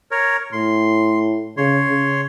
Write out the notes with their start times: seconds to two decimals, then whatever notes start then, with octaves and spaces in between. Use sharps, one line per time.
0.11 A#4 C#5
0.52 A2 C6
1.57 C#3 C#5 C6
1.90 C#3